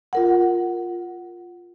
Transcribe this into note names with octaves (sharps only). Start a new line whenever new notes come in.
F4 A#4 F#5